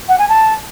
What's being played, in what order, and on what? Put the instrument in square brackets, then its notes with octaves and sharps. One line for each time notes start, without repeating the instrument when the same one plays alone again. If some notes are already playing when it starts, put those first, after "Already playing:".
[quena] F#5
G#5
A5